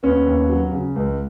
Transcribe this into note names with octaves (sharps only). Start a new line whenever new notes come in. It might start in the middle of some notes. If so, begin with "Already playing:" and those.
D#2 B3 C#4
D#2
F#3
C#3
C#2